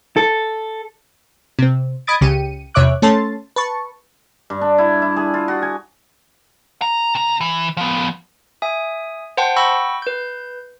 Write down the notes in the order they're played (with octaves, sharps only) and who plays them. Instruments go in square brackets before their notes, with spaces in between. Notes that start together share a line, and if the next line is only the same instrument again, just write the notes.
[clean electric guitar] A4
[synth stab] C3 C4
D#5 B5 D#6 G#6 A6 D7
C#2 C#3 G4 C#7 D#7
E2 C3 C#5 E5 D6 F#6
A3 C#4 A4 A5 C6 A6
B4 A5 C#6
[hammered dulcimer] G2
D4
E4
E4
G#4
F4
F#4
G#5
[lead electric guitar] A#5
C3 A#5
E3
F3 B3
[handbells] E5 G#5 D#6
C5 F#5 G5 A5 C6
F#5 G5 B5 C#6 E6 A#6
B4 G6